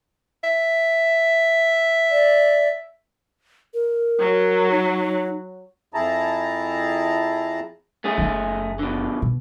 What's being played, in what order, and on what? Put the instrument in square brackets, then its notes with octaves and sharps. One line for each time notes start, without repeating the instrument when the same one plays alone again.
[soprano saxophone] E5
[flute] D5
[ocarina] A#4
[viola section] F#3
[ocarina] D#4
[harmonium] F2 E4 G#4 A5 A#5
[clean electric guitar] A3 C#4 G#4
[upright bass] F#1 F3
[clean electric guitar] B2 D3
[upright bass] B2